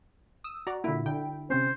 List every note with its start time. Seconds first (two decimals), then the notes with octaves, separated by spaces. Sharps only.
0.44 D#6 E6
0.67 F#4 D5 A#5
0.84 A#2 D3 E4
1.06 D3 G5
1.50 C3 C4 C#4 C5